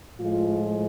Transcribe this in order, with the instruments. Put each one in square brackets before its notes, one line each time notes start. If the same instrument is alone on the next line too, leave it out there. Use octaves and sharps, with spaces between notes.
[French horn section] A2 F3 G#3 F4